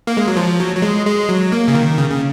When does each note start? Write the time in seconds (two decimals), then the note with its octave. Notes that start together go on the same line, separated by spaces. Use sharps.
0.07 A#3
0.17 G#3
0.28 F#3
0.37 F3
0.60 F#3
0.76 F#3
0.82 G#3
1.06 G#3
1.29 F#3
1.52 A#3
1.68 C#3
1.75 D#3
1.98 C#3
2.10 C#3